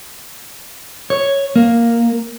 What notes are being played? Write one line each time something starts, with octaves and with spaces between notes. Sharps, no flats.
C#5
A#3